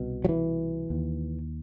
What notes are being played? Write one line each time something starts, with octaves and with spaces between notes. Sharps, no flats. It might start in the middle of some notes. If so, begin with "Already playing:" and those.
Already playing: C2 B2
F#3
E3
D#2